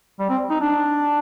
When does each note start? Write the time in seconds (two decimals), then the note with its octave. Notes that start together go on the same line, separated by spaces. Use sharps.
0.19 G3
0.29 C4
0.50 D#4
0.61 D4